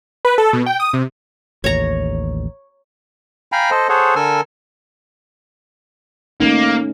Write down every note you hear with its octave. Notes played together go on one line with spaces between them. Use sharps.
B4
A4
B2
G5
D#6
C3
A1 D#2 C#5 A#5
F5 G5 G#5 A#5 B5
A4 C5 D#5
G#4 A4 C5 C#5 F#5
D3 A4 A#4 G#5 E6
A3 A#3 C#4 D#4